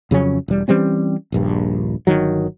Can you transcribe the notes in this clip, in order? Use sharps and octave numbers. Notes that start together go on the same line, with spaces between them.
F2 C#3 F#3 C#4
E1 G3
E3 G3 C4 C#4
D#1 A#1 G2
G1 D#3 F#3